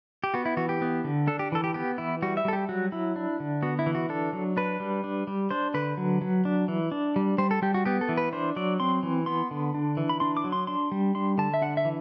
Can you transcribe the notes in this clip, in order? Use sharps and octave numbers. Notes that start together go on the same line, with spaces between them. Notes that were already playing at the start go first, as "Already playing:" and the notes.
G4
B3 F#4
E4
E3 F#4
G4
B3
D3
D4 A4
G4
E3 A4
G4
B3 G4
E3 E4
G3 F#4
E5
G3 A4
G4
F#3 F#4
F#3 E4
D4
D3
B3 F#4
E4
E3
F#4
D4 A4
F#3
D4 B4
G3
D4
G3
D4 C5
D3 B4
F#3
F#3
D4
E3
D4
G3
G3 C5
A4
G3 G4
F#4
B3 G4
A4
E3
B4
D4 C5
F#3 D5
C4 C6
E3
B3 C6
D3
D4
E3
B5
D4 C6
D6
F#3
C6
D4 C6
G3
D4 C6
D3 A5
E5
D4 F#5
E5
E3